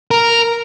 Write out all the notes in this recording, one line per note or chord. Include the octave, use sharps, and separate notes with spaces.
A#4